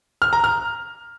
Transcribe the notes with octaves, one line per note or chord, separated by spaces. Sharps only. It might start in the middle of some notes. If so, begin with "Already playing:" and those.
F6
A#5
F6